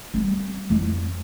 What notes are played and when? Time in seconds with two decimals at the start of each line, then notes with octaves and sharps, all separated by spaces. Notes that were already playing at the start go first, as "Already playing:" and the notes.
0.14 G3 C4
0.70 F2 E4